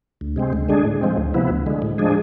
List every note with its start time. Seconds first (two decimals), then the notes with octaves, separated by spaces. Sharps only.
0.21 D2
0.36 C3 G#3 C4
0.53 D2
0.69 D3 G#3 D4 G#4
0.85 A2
1.01 F3 G#3 C4
1.17 D2
1.34 C3 F3 B3 E4
1.50 D2
1.66 D3 G#3
1.82 A2
1.98 F3 G#3 D4 G#4